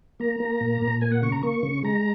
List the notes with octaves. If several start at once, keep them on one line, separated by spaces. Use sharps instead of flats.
A#3 A#5
A#3
A#2
A#2
A#3 G#5
F#5
C#3 C#6
A#5
A#3 C#6
C#3
G#3 A#5